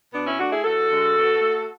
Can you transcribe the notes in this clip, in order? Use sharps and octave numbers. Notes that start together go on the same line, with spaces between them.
B2 B3 D4
C#4 E4
A3 D4 F#4
E4 G#4
E2 F#4 A4
D3 G#3
B2
A3